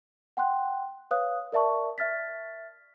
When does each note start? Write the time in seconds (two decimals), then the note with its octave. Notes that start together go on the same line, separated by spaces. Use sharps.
0.37 F#5 G5 C6 F#6
1.11 B4 C#5 F5 D#6 F#6
1.52 A#4 D5 E5 A5 C#6
1.98 E5 F6 A6 B6